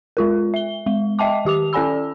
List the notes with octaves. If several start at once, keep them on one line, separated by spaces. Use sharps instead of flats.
G#3 F4 A#4
E5 G7
G#3
D#5 E5 G5 A5 D6
D#3 G4 D6 F7
C#4 A4 D5 G#5 B5 E6